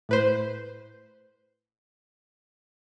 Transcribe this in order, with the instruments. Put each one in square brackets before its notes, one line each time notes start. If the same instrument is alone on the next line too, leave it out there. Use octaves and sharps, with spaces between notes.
[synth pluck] A2 B4 C5